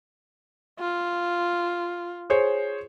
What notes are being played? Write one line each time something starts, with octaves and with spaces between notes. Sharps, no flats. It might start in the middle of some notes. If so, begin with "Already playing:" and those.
F4
G#4 C5 C#5